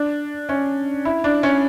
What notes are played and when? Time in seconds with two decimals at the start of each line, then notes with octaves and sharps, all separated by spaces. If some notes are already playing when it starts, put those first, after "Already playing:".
Already playing: D4
0.49 C#4
1.05 E4
1.24 D4
1.43 C#4